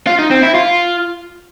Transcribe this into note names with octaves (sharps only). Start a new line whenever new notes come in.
F4
D#4
C4
E4
F4